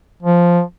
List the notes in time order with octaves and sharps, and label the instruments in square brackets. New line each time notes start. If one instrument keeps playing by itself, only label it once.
[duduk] F3